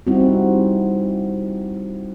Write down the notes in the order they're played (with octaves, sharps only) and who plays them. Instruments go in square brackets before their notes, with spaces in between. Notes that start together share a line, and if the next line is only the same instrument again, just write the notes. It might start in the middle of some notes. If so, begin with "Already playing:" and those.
[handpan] G3 C4 D#4 E4 F#4